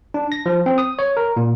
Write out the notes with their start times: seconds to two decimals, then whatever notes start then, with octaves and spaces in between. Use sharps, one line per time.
0.14 D4
0.32 A#6
0.46 F3
0.66 C4
0.78 D#6
0.99 C#5
1.17 A#4
1.36 A#2